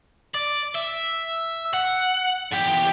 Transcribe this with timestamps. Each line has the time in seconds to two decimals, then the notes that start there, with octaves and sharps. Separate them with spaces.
0.35 D5
0.75 E5
1.73 F#5
2.52 E2 G4